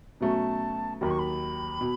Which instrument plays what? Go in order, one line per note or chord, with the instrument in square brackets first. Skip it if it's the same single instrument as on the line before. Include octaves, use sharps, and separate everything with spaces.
[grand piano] B2 F#3 A3 C#4 [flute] A5
[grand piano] D#2 D#3 F#3 [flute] B5
[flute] C#6
B5
[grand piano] B2